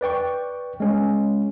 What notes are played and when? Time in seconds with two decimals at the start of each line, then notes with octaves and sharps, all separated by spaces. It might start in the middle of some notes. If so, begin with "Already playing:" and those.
0.01 B4 D5 G5 C#6
0.80 G#3 C#4